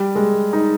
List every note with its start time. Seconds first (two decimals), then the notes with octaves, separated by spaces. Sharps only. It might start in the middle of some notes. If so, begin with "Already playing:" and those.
Already playing: G3
0.16 G#3
0.53 D#4